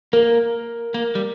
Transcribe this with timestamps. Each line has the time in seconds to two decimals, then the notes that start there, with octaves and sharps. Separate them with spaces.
0.13 A#3 A#4
0.94 A#3
1.15 G3